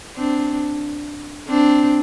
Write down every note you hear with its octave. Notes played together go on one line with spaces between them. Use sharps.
C4 D4
C4 D4